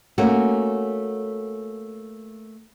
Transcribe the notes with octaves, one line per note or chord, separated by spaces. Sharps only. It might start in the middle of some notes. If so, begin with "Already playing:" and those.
A3 A#3 C#4 F#4